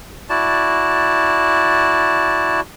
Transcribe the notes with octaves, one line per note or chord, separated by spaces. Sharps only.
E4 F#4 D5 A5